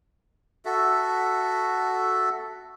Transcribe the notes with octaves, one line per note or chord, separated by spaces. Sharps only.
F#4 A4 E5